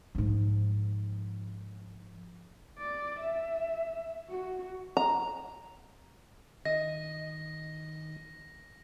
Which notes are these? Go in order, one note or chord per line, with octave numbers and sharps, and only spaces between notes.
G#2 F3
D5
E5
F#4
A#5
D#3 D#5 A#6